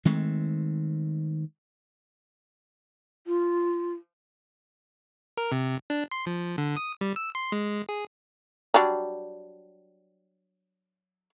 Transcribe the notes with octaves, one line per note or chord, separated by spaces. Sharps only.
D#3 G#3 A3 C4
F4
A#4
C3
D4
C6
F3
D3
D#6
G3
E6
C6
G#3
G#4
F#3 G3 D4